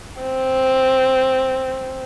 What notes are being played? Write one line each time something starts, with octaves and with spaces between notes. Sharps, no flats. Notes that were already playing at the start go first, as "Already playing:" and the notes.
C4